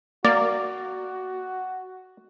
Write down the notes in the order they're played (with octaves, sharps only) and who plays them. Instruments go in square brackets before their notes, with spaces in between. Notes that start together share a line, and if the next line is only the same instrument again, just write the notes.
[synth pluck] A#3 [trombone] F#4 [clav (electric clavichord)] D5